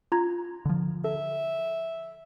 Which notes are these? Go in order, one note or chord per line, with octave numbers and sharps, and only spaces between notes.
F4 A#5 G#6
D3 F3
A4 E5